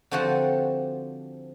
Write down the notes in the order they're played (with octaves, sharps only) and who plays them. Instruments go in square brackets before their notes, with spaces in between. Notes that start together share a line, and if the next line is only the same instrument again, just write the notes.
[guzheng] D3 F3 C4 F#4 G4 A4